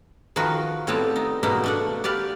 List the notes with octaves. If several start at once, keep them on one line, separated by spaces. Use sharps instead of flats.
D#3 F3 F#4 A#4 B4
A2 G3 B3 C4 G4 A5
D#4
G#2 B2 A#3 D#4 B5
A3 D4 F#5
G4 B4 D5 F5